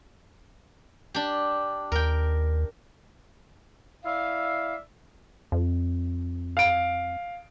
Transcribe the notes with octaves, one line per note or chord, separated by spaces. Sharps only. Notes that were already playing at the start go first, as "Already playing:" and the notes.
D4 G4
D#2 A#4 G5
E4 D5 E5 F5
F2
F5 D7